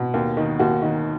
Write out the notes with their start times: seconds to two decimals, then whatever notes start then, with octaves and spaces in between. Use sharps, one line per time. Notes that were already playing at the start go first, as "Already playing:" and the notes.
Already playing: B2
0.14 D#2
0.37 D#3
0.59 D#2 F#4
0.82 D#3